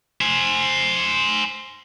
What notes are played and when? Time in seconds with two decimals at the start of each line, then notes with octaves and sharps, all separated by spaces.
0.21 C5 G#5